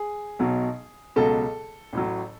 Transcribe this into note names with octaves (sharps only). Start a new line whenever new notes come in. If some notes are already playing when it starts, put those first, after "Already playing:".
Already playing: G#4
B1 B2 F#3
C#2 B2 F#3 A4
A1 A2 F#3